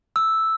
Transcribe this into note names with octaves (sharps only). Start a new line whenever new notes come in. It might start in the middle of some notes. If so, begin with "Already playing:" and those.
E6